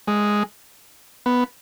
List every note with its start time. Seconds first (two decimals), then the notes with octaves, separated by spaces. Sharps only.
0.08 G#3
1.26 B3